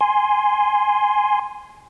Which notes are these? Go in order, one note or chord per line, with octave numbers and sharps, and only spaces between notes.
G#5 C6